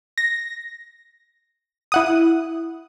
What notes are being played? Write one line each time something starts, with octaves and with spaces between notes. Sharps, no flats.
A#6
E4 F#5 D#6